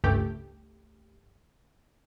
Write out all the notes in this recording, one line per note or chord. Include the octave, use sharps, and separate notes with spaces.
G1 C#2 G2 A3 G4